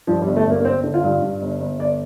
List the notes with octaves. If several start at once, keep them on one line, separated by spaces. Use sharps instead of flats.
G2 F3
G3
G1
A3
G2 A#3
A#3
G1 C4
D3
F4
G2
G2
G1
G1
G1 D5